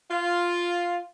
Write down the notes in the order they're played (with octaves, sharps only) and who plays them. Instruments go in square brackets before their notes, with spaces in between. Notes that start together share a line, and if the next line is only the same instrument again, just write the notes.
[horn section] F4